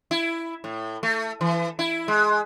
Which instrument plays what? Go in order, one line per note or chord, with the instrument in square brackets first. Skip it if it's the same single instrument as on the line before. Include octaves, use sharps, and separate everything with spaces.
[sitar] E4
A2
A3
E3
E4
G#3